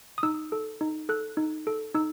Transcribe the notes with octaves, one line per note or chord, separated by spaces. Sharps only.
D#6
D#4 E6
A4
D#4
A4 F#6
D#4
A4
D#4 E6